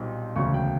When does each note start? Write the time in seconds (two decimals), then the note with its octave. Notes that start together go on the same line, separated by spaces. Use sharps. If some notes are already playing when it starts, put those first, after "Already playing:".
Already playing: B1 A#2 G3 C4 D#4
0.35 E1 D2 C#3 C#6
0.54 G5